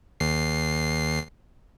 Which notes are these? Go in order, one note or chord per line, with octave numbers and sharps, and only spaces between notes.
D#2 C7